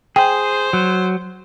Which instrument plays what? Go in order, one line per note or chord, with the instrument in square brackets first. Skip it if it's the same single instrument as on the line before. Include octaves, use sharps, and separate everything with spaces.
[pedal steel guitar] G#4 [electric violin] C5 [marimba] G5
[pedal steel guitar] F#3